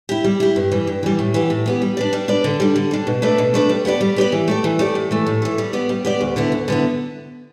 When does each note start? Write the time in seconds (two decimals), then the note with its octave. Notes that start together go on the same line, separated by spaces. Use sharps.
0.09 E4 G4
0.24 G3
0.40 E4 G4
0.56 G2
0.72 E3 G3
0.87 G2
1.03 E3 G3
1.19 A2
1.34 E3 B3 G4
1.50 A2
1.66 E3 B3 G4
1.82 G3
1.97 D4 B4 D5
2.13 G3
2.28 D4 B4 D5
2.44 D3
2.60 G3 D4
2.76 D3
2.91 G3 D4
3.07 B2
3.22 A3 D4 B4 D5
3.38 B2
3.54 A3 D4 B4 D5
3.69 G3
3.85 B3 G4 B4 D5
4.01 G3
4.16 B3 G4 B4 D5
4.32 E3
4.48 A3 G4 D5
4.64 E3
4.79 A3 G4 D5
4.95 A2
5.11 E3 A3
5.27 A2
5.42 E3 A3
5.58 G3
5.73 B3 G4 D5
5.89 G3
6.05 B3 G4 D5
6.21 D2
6.36 D3 B3 E4
6.52 D2
6.68 D3 B3 E4